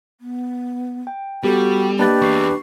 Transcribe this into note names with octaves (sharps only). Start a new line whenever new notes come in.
B3
G5
G3 B3 F#4 G4 A4
A#3 D4 G4 B4 D#5 A6
E2 C#6 C7